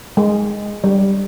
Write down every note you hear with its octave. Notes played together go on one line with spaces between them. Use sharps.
G#3
G3